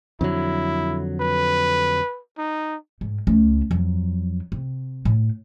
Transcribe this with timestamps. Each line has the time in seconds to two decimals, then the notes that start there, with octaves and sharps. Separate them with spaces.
0.21 F2 D3 F#3 E4
1.20 B4
2.38 D#4
3.01 G#2
3.27 C#2 A3
3.71 F2 F#3
4.52 C3
5.05 A2